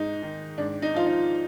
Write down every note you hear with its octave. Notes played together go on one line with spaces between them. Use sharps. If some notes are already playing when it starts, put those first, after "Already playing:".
Already playing: G#2 D#4
D#3
G#2 D4
D#4
F3 F4
D#4